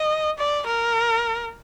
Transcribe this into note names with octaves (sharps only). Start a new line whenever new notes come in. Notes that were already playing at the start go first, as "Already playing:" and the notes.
Already playing: D#5
D5
A#4